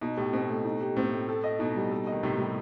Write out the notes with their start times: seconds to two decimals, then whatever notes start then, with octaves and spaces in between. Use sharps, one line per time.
0.01 B2 D#4
0.17 A2 G4
0.33 B2 C4
0.49 A3
0.65 D#4
0.81 G4
0.96 A2 C4
1.12 A3
1.29 A4
1.44 D#5
1.59 B2 D#4
1.76 G3
1.91 A4
2.07 D#5
2.12 D#3
2.23 A2 C3 D#4
2.39 G3